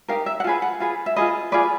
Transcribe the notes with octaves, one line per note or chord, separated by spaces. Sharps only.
D#4 G4 A#4 F5
E5
F#5
F4 G#4 B4 F5
F#5
F4 G#4 B4
E5
F4 G#4 B4 D#5
F4 G#4 B4 D5